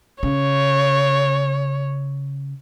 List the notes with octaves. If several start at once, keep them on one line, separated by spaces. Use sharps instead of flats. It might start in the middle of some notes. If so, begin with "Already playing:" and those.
C#3 C#5